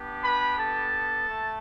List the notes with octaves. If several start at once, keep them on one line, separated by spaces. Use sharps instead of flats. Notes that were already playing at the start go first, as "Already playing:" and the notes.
Already playing: B3 D4 G4
B4 B5
A4 A5
A3